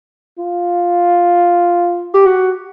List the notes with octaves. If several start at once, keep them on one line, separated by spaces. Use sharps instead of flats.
F4
G4
F#4